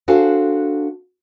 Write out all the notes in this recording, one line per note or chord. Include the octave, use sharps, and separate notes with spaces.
D4 F#4 A4 C5 F5 G#5